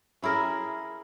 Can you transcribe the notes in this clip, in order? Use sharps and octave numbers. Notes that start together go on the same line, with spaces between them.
C#4 E4 G#4 A#4